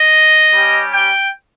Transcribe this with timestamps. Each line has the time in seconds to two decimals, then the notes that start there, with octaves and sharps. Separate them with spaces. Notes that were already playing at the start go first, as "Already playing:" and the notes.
Already playing: D#5
0.53 G3 C#4 G4
0.93 G5